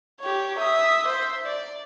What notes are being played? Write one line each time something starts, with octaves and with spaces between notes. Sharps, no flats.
G4 C#5
E5 D#6
C5 E5
D5